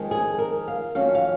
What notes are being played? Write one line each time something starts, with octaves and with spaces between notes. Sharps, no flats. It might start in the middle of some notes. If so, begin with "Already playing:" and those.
Already playing: F2 D#3 G#3 C4
G#4
A#4
F5
F2 D#3 F#3 C#4 F5
F5